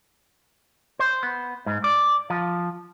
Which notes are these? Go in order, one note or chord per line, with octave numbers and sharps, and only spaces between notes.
C5
B3
G#2
D5
F3